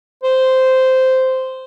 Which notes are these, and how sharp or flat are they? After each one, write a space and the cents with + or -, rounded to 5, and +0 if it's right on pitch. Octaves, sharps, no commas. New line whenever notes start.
C5 -10